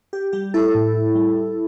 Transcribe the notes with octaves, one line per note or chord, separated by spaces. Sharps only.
G4
G3 G4
E4 A4
A2
G3